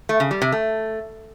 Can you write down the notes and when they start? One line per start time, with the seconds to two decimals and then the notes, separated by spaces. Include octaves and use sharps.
0.09 A3
0.20 C#3
0.31 G3
0.42 C3
0.52 A3